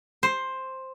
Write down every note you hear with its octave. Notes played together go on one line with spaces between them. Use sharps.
C5